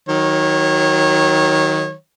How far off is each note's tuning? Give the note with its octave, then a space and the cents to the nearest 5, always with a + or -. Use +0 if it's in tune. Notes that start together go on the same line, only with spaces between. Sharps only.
D#3 +15 F#3 +5 C#5 -25